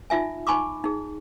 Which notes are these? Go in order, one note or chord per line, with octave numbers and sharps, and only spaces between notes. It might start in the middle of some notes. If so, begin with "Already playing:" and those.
D#4 F4 E5 G#5
D#4 G#5 B5 C#6 D6
D#4 G#4